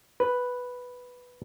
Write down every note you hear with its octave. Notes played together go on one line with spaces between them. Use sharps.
B4